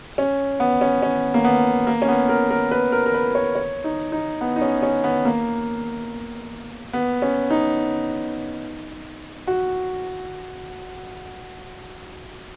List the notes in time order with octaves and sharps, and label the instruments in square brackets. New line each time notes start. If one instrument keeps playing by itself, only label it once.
[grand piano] C#4
B3
C#4
C#4
A#3
B3
A#3
C#4
B3
A#4
A#4
B4
A#4
A#4
B4
C#5
C#5
D#4
D#4
B3
D#4
C#4
C#4
B3
A#3
B3
C#4
D#4
F#4